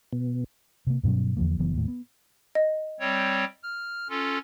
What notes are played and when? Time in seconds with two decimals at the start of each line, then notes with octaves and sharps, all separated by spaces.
0.13 B2
0.87 C3 A#3
1.03 G2 B2 F#3 C#4
1.37 E2 D3 F3 A#3
1.59 F#1 F#2 E3 B3
1.74 D#2 A2
1.88 B3
2.55 D#5
3.00 G3 C4 C#5
3.63 F6
4.09 C#4 F4 A4